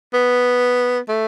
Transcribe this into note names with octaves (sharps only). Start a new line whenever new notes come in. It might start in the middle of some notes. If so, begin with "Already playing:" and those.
B3
A3